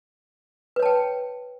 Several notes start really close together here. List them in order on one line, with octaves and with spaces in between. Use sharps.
B4 C#5 A5 G5